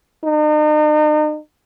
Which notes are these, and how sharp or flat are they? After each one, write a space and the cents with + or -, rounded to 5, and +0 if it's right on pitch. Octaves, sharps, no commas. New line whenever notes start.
D#4 -40